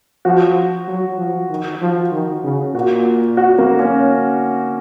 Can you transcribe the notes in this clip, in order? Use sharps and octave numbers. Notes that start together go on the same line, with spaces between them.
F3 F#4
F#3
F3
D#3
F3
D#3
C#3
A#2 F#4
F#4
A#3
C#4